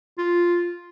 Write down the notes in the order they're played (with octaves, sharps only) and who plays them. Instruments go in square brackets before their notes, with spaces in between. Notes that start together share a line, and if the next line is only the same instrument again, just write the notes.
[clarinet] F4